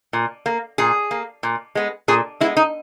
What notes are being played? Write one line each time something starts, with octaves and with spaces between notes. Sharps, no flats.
A#2
A#3
A#2 G#4
A#3
A#2
G#3 B3
A#2 G#4
G#3 B3 E4
D#4